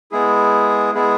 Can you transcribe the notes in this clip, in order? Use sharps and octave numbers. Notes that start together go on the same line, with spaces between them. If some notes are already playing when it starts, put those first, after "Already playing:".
G#3 B3 E4 G#4
G#3 B3 E4 G#4